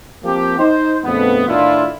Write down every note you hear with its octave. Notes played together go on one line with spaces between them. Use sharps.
F3 A#3 C4 G4
D#4 C5
A#1 F2 A3 B3
A2 D#3 D4 E4 F4